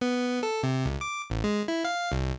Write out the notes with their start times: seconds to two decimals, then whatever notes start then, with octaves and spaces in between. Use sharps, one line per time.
0.01 B3
0.43 A4
0.63 C3
0.85 C#2
1.01 D6
1.30 A1
1.44 G#3
1.68 E4
1.85 F5
2.12 C2